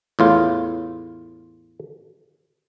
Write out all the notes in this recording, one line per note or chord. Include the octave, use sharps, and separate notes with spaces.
E2 A2 F4